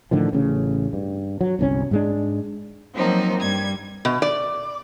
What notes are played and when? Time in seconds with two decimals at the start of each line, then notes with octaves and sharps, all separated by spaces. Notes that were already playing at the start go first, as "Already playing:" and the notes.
0.11 A2 D3 D#3 F3
0.33 A1 C#3
0.93 G2
1.41 F#3
1.59 G1 C2 C#4
1.91 G#2 G#3 D4
2.96 F3 F#3 A#3 C4 D#4
3.42 G2 G3 G#6
4.05 B2
4.22 D5